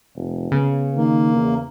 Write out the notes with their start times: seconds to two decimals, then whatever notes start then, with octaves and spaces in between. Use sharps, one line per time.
0.15 F1
0.52 C#3 B3
0.96 D#3 A#3
1.35 E2